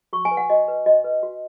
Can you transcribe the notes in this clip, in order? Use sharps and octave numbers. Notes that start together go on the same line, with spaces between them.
F#4 C#6
G#5
B4
F#5
F#4 D#5
B4
F#4 D#5
B4
F#4